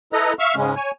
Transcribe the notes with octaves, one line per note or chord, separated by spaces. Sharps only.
E4 A4 B4 D#5 A#5
E5 F5 C#6 E6 F6
G#2 C#3 G#3 C#4
C#5 G#5